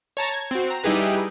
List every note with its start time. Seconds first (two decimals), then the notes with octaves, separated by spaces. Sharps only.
0.17 C#5 A5 A#5
0.33 G#6
0.51 C4 F#4
0.70 A#5
0.84 G3 D#4 E4 G4 G#4 B4